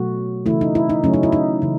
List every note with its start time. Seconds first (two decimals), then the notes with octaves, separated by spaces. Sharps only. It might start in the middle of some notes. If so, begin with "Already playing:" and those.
Already playing: B2 F#3 A3 F#4
0.46 C#3 E3 A3 E4
0.61 D#4
0.75 E4
0.90 D#4
1.04 C#3 F#3 A3 C#4
1.14 D#4
1.23 E4
1.32 D#4
1.62 C#3 E3